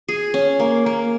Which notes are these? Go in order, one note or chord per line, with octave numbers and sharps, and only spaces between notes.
G#4
C#4
A#3
A#3